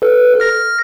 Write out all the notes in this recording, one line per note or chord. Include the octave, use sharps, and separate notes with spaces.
A4 B4
F6 A#6